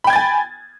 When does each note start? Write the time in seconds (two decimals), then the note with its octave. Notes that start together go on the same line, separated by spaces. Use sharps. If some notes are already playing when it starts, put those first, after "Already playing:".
0.04 B5
0.07 G5
0.10 G#6
0.13 A6
0.16 G#5